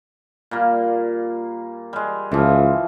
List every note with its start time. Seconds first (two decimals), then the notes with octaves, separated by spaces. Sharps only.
0.51 A#2 G3 A#3
1.93 G3 G#3
2.32 C#2 E3 F3